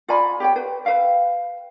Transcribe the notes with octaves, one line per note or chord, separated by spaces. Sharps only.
F4 D5 G#5 B5
G4 C#5 G5
B4
B4 E5 F5 G5